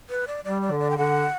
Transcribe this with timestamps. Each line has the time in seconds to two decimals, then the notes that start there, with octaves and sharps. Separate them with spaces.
0.10 B4
0.28 D5
0.45 G3 D5
0.62 D5
0.71 D3
0.80 D5
0.90 G5
0.97 D3 F#5